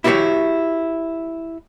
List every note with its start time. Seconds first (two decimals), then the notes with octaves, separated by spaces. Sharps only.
0.04 E4 F#4 G4 A#4 C#5 E5